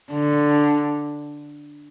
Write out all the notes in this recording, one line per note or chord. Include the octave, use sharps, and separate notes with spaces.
D3